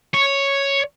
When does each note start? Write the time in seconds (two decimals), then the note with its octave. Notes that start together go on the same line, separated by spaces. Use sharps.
0.14 C#5